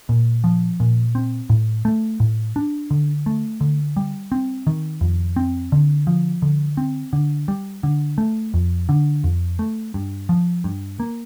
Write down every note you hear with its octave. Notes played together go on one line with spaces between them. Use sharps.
A#2
F3
A#2
C4
A2
A3
A2
D4
D3
A3
D3
G3
C4
D#3
F2
C4
D3
F3
D3
C4
D3
G3
D3
A3
F2
D3
F2
A3
G2
F3
G2
A#3